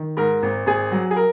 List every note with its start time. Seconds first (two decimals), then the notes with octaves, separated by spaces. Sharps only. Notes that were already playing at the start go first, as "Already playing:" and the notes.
Already playing: D#3
0.17 G#2 A#4
0.43 G#1
0.66 G#1 G#4
0.92 F#3
1.11 G#4
1.16 A#4